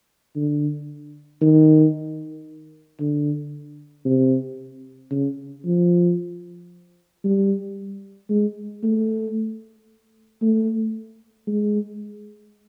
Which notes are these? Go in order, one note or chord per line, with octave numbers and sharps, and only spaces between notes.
D3
D#3
D3
C3
C#3
F3
G3
G#3
A3
A3
G#3